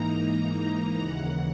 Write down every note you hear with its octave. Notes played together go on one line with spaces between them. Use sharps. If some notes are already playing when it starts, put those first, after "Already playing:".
Already playing: G#2 E3 A#3 D#4 A#5
D#2 C#3 E3 F#5